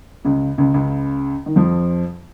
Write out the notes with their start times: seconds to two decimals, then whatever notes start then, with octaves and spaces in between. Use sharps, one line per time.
0.25 C#2 C#3
0.58 C#2 C#3
0.74 C#2 C#3
1.46 D#3
1.56 F2 F3